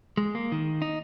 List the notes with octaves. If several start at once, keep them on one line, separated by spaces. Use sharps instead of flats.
G#3
A#3
D#3
D#4